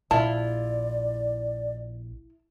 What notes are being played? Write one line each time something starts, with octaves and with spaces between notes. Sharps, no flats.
A#1 E4 F4 D5 A5